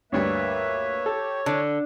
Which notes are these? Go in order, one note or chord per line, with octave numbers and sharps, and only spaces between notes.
D2 G2 A#3 B4 C#5 E5
G4 A4
D3 D4 A5